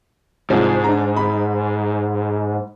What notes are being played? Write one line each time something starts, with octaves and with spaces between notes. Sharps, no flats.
C2 G#2 F3
D4 A#5
B5